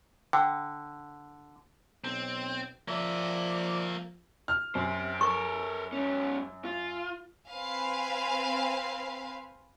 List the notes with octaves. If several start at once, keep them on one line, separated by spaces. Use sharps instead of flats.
D3 G5
B1 C4
F3 A#3 D5 E5
F6
F#2 G4 C5
A4 A#4 C#6
G#2 C#4
F4
C4 B4 F5 G#5